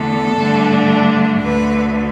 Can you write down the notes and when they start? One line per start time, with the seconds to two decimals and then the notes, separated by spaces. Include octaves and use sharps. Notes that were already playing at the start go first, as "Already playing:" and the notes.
Already playing: E2 D3 A3 D4 A4
0.37 G2 D3 A3 D4
1.42 D2 D3 A3 B4